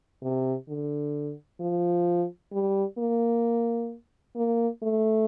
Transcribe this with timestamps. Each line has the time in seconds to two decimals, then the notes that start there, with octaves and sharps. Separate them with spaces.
0.22 C3
0.69 D3
1.61 F3
2.52 G3
2.98 A#3
4.36 A#3
4.82 A3